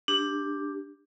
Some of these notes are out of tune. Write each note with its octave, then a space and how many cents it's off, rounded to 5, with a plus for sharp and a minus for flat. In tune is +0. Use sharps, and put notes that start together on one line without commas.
D4 +0 G4 +15